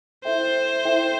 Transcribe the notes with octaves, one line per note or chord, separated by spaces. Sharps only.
E4 A4 C5 E5 G5
E4 A4 E5 G5